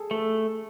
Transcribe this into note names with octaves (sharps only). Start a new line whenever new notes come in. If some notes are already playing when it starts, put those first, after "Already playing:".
Already playing: G#4 A4
A3 A4